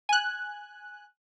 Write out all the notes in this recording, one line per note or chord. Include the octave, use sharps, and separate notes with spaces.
G#5 F#6